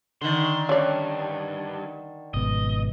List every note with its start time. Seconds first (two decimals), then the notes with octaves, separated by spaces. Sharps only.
0.22 D3 D#3 C6
0.69 G2 C#4 D5
2.34 G#1 B2 D#5